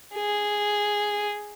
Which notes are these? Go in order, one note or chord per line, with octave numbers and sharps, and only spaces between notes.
G#4